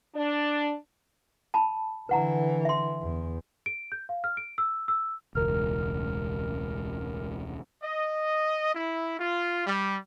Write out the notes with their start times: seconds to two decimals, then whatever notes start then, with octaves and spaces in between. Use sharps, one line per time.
0.15 D4
1.54 A5 B5
2.09 D3 E3 B4 F#5 A#5
2.65 E5 C6
3.02 E2
3.66 D7
3.92 G6
4.09 F5
4.24 F6
4.37 D7
4.58 E6
4.88 E6
5.35 E1 C#2 A#4 F6
7.83 D#5
8.74 E4
9.19 F4
9.66 G3